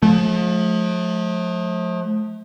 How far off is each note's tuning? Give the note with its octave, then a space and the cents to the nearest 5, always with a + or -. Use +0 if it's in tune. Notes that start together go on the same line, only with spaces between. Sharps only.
F3 +35 A3 -35